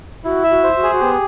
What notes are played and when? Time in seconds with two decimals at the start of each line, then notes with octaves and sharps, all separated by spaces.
0.24 E4 F#4
0.44 E5
0.50 F#4
0.64 C5
0.76 F#4
0.83 G#4
0.92 F#4
1.02 B3 G4